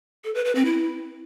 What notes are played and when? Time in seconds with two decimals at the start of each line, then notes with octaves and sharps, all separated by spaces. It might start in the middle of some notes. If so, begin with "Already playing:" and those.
0.24 A4
0.35 B4
0.45 B4
0.55 C4
0.66 E4